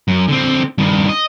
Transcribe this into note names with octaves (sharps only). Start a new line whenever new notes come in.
F#2
D3 C4
G2 D#3
D#5